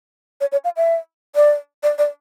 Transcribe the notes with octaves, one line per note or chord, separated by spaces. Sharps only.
C#5
C#5
F5
E5
D5
D5
D5